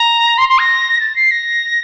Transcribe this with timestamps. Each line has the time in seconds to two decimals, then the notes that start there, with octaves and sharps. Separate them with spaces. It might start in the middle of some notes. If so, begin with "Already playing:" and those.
Already playing: A#5
0.37 C6
0.48 C6
0.58 A#6
1.00 A6
1.15 C7
1.31 A#6